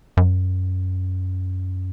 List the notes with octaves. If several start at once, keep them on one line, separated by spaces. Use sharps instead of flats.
F#2